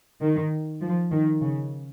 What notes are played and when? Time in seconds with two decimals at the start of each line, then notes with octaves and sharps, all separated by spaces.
0.21 D#3
0.82 F3
1.11 D#3
1.41 C#3